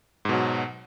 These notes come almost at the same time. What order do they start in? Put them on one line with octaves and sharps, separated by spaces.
G#2 B2 F#3